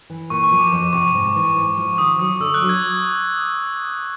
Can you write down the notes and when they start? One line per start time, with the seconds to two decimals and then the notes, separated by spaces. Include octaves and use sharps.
0.10 E3
0.30 A#2 C#6
0.44 C#6
0.52 F3
0.59 D6
0.72 F2 C#6
0.93 C3 C#6
1.15 G#2
1.35 E3
1.56 G#2
1.77 F3
1.98 D#3 D#6
2.19 F#3 D#6
2.40 D3 E6
2.54 F#6
2.62 F#3
2.69 G#6